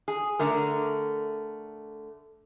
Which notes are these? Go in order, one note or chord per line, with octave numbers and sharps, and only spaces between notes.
G#4
D3 A3 A#4